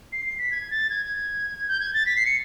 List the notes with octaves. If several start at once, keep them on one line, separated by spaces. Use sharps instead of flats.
C7
C7
B6
G#6
A6
G#6
G6
G#6
A6
B6
C7
C#7